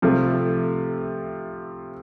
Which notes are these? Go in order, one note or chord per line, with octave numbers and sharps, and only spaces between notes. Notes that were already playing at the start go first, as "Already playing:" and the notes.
C3 F3 A3